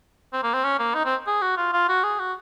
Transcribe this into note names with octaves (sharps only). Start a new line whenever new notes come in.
C4
A#3
C4
C#4
A#3
D#4
C4
G#4
F#4
F4
F4
F#4
G#4
F#4